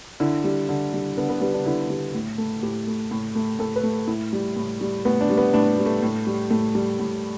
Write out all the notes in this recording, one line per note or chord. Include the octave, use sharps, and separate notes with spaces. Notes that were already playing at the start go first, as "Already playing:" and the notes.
D3 E4
G3
D3
G3
D3 B3
B3
G3 B3
D4
D3 E4
G3
A2
A3
A2 G4
A3
A2
A3
A2 A4
B4
A3
A2 E4
G3
A2
G3
A2 B3
D4
G3
B3
A2 D4
G3
A3
A2
G3
A2 A3
G3
A2